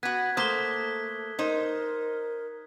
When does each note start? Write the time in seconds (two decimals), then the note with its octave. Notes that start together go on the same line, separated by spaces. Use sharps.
0.03 B3 F#4 F#6 G#6 B6
0.37 A3 A#3 C5 D#6 B6 G7
1.39 D#4 A#4 C5